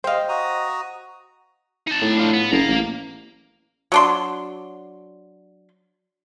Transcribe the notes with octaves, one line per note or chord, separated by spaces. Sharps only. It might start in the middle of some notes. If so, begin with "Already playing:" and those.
C5 D#5 F5 G5
F#4 A#5 D#6
D#4 A5
A2
D4 F4
B3
F#1 A#3 A#5
A1
F#3 D4 C6